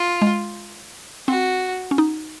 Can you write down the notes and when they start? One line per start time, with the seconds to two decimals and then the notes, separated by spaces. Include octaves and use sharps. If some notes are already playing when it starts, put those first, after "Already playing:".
Already playing: F4
0.22 G#3
1.28 C4 F#4
1.91 C#4
1.98 D#4